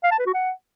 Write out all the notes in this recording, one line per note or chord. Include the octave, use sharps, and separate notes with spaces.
F5
A5
B4
F#4
F#5